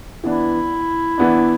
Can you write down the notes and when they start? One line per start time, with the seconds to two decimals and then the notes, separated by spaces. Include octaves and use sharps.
0.24 E3 B3 D4 E4
1.18 E3 B3 D4